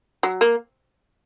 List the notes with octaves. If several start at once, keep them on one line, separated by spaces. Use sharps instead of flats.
F#3
A#3